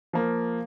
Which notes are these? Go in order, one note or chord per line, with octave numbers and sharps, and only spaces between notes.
F3 A#3